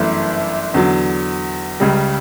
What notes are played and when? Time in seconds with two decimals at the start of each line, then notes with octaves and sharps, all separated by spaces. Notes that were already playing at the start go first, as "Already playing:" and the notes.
Already playing: G1 F#2 E3 A3
0.74 E2 D3 F#3
1.80 C#2 C#3 G3